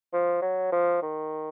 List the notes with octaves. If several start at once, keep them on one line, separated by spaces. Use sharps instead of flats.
F3
F#3
F3
D#3